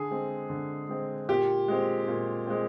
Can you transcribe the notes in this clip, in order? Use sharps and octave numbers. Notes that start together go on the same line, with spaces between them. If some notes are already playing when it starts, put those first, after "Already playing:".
Already playing: D3 G#4
G#3 C4
D3
G#3 C4
A#2 G4
G#3 C4
A#2
G#3 C4